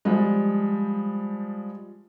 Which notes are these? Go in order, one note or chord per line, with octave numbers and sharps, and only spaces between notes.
F3 G3 G#3